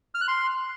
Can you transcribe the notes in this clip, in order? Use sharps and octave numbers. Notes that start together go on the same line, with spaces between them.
F6
F#6
C6